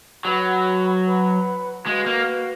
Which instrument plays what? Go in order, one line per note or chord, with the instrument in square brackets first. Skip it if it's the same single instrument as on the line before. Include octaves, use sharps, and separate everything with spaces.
[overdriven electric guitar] F#3 [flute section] B4 F#5 B5
[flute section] B4 F#5 B5
[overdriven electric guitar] G#3 [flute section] F#4 B4 F5
[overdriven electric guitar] A#3